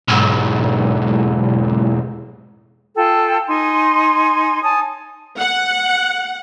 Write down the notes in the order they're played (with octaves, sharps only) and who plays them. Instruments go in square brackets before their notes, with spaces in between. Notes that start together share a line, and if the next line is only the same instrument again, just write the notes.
[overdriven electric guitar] B1 G#2
[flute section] F4 A4 G5 G#5
D#4 G#5 C6
C#5 G#5 A5 D#6
[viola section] F#5